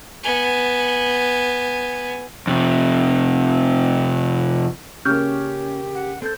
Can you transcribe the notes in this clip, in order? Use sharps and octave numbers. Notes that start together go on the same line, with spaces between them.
B3 G#5
F2 C3
C#3 A#3 C#4 G4 C#6 F6 G6
F#5
C4 A4 C5 G6